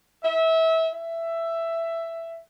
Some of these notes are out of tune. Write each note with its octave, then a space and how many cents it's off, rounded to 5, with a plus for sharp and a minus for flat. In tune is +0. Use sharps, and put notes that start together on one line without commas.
E5 -25
E5 +10